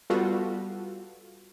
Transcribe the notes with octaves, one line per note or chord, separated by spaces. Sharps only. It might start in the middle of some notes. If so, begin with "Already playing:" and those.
G3 B3 F4 F#4 A4